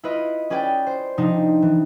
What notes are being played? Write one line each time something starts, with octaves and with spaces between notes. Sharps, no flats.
E4 F4 B4 D#5
C#4 G#4 B4 D5 G5
C5
C3 F3 D4 D#4
E3